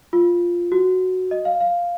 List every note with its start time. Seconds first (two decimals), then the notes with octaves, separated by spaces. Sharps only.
0.13 F4
0.72 F#4
1.31 D#5
1.45 F5
1.60 F5